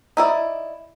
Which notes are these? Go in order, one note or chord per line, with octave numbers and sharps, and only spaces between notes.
D#4 E4 D5